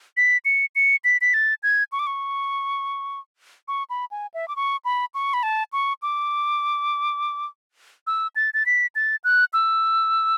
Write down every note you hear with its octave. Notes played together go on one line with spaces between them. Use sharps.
B6
C#7
C#7
B6
B6
A6
G#6
C#6
D6
C#6
C#6
B5
G#5
E5
D6
C#6
B5
C#6
B5
A5
C#6
D6
E6
A6
A6
B6
A6
F#6
E6